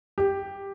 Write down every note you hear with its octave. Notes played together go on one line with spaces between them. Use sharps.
G4